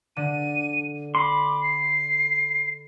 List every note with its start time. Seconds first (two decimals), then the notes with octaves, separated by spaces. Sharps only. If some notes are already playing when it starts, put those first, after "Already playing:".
0.16 D3 D#7
1.15 B5 C6 D6
1.61 C7